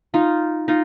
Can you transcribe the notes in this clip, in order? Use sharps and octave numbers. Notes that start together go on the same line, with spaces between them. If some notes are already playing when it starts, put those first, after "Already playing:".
D#4 F4
D#4 F4